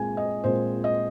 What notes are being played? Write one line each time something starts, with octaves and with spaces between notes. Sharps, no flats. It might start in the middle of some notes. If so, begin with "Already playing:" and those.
Already playing: A#2 G#3 C4 G#5
D#5
A#2 G#3 C4 C5
D#5